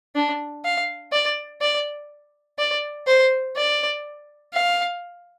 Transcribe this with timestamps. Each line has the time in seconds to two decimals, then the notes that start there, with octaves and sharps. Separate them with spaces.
0.15 D4
0.65 F5
1.12 D5
1.62 D5
2.59 D5
3.07 C5
3.57 D5
4.53 F5